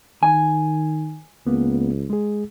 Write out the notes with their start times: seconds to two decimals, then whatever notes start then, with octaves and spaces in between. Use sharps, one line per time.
0.23 D#3 G#5
1.47 C#2 A#3 B3
2.10 G#3 G#4